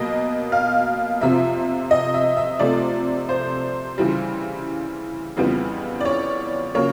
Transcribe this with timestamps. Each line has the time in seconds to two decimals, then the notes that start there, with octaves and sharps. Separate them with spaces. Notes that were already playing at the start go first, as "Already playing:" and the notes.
Already playing: B2 F#3 A#3 D#5
0.52 F5
1.21 F2 C3 F3 E5
1.91 D#5
2.14 E5
2.37 E5
2.59 C3 F3 A3 D5
3.29 C5
3.98 C#3 E3 G3
5.36 F2 C#3 E3 G3 B3
6.01 D5
6.05 C#5
6.75 C#3 F#3 A#3 C#5